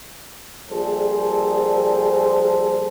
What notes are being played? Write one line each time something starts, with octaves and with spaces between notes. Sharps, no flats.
A#1 G3 G#4 A4 C5